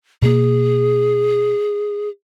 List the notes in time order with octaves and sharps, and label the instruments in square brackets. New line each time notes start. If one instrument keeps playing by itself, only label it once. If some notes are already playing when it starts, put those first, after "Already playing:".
[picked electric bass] B2 A#3 [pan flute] G#4